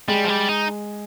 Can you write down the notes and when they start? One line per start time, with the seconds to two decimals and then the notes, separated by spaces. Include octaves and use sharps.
0.08 G3 G#3
0.24 F3
0.29 G3
0.49 D#4